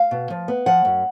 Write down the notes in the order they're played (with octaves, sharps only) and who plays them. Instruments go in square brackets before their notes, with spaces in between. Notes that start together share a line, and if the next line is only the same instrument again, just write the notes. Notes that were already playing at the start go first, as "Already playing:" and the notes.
Already playing: [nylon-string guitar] F5
B2
F3
B3
F3 F#5
F#2